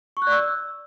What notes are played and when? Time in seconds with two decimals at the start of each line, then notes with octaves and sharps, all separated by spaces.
0.17 C#6
0.22 F#6
0.27 D5
0.32 E6